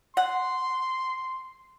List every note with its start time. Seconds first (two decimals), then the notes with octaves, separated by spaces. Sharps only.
0.17 F#5 C6